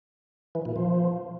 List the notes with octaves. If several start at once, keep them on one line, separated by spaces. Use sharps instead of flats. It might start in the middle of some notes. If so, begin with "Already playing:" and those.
E3
A#2
F3